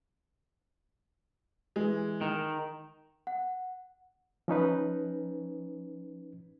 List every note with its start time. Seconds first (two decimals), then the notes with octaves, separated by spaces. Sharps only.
1.76 E3 G#3
2.21 D#3
3.27 F#5
4.48 F3 C#4 D#4 B4